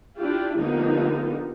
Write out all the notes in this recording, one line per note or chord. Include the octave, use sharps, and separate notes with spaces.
D4 E4 F4 G4
D3 F3 A#3 B3 D#4 G4